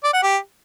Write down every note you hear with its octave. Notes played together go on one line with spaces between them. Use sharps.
D5
F#5
G4